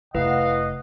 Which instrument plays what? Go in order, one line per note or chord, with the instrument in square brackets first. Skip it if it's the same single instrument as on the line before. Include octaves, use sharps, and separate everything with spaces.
[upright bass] F1 [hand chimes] E4 B4 [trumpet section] D#5 F#5 [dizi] F5